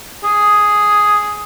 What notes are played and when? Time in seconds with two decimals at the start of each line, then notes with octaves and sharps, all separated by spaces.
0.24 G#4